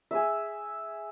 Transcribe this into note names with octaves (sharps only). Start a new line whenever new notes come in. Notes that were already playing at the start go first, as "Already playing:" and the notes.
G#4 E5